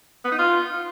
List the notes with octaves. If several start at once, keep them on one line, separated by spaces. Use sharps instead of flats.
B3
D#4
F4